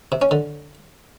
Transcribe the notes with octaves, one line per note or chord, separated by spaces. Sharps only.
C3
C#4
D3